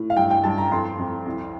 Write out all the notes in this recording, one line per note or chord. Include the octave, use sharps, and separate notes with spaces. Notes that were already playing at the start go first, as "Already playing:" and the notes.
Already playing: A2
F5
G2 G5
G5
G2 A5
A#5
F2 C6
F2
C2